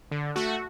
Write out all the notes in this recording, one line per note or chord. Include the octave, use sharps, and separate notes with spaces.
D3
A3 F#4